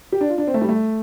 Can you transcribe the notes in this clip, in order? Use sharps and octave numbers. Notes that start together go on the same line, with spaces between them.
G4
D4
F4
D4
C4
A3
G3
A3